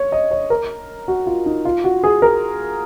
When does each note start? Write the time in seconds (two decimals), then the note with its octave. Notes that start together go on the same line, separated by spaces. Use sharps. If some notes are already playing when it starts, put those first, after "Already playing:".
Already playing: C#5
0.12 D#5
0.31 C#5
0.50 A#4
1.08 F#4
1.27 F4
1.46 D#4
1.65 F4
1.84 F#4
2.04 G#4
2.22 A#4